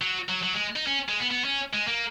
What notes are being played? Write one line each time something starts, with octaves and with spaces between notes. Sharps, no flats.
F#3
F#3
F#3
G#3
D#4
C#4
G#3
B3
B3
C#4
G#3
A#3